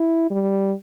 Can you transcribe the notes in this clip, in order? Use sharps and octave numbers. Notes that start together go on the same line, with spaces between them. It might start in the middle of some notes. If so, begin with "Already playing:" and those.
Already playing: E4
G3